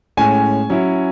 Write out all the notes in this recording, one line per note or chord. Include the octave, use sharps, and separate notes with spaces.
A2 G#3 C#4 G#5
F#3 C#4 E4